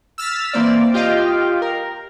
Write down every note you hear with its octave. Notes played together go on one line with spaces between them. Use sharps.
E6 F6 A6 B6
E3 A#3 C4 D5
F4 G4 D#5 F5 G5
A#4